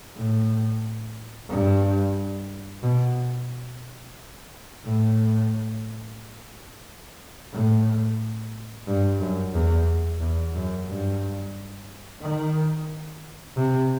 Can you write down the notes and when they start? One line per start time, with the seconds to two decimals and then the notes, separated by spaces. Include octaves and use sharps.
0.16 A2
1.49 G2
2.83 B2
4.85 A2
7.53 A2
8.88 G2
9.20 F#2
9.54 E2
10.21 E2
10.55 F#2
10.88 G2
12.22 D#3
13.57 C3